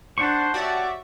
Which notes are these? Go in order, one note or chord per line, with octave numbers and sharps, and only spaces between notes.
D4 C5 F#5 A5 C#6
F#4 G4 C#5 D5 E5 F#5